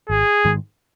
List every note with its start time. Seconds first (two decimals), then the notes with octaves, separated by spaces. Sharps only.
0.09 G#1 G#4
0.45 G#2 D#3 G#3